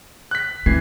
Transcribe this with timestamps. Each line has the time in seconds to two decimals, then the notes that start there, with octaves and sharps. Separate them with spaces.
0.31 F#6 B6
0.66 E3 C4 G#6 C7